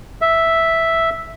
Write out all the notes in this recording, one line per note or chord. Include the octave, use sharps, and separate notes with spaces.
E5